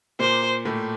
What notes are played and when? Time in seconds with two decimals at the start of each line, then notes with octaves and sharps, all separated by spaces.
0.19 A#2 A#3 C5
0.65 A2 A3